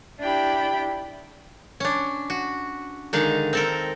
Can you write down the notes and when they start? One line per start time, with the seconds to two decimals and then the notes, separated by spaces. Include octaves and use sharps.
0.20 D4 E4 G4 G5 B5
1.80 C#4 D4
2.30 F#4
3.13 D3 D#3 G#3 D#4 F5
3.53 C4 A4 A#4